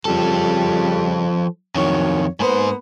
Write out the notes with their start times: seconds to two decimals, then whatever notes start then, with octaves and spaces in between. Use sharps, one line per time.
0.05 F2 C#3 F3 G3 A4
1.75 F2 D#3 F#3 C#5
2.40 G#2 A#3 B3 B4 C5